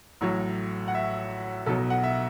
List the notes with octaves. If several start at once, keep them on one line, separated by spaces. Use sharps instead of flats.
A1 A2 F#3 C#5
F#5
E5
B1 B2 F#3 A4
F#5
E5